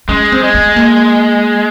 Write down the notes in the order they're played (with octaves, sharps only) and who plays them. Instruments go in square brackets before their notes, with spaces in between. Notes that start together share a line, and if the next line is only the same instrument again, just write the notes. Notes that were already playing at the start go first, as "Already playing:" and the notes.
[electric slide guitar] G#3 [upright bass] C#4
[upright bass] C4
[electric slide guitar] G#3
[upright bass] B3
A#3